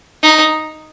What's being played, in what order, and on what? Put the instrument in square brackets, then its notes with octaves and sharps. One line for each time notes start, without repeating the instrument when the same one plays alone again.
[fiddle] D#4